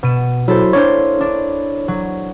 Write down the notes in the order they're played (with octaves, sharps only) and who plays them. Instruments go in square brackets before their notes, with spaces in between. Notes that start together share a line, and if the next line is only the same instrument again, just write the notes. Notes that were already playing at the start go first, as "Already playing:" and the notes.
[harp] B2 D#7 E7
[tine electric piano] F#3 [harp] E4 A4 C5
[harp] A#3 D4 C5 [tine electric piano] C#5
[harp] D4
F#3